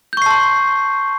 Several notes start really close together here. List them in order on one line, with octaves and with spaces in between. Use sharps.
G6 C#6 C7 A5 C6